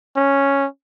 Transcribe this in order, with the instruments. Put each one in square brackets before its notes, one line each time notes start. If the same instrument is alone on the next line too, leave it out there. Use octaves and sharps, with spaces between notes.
[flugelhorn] C#4